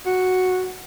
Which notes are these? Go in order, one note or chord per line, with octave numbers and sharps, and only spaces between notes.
F#4